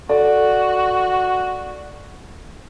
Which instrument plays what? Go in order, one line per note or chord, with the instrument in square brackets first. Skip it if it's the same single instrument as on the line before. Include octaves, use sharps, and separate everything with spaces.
[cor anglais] F#4 [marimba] A4 [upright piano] D5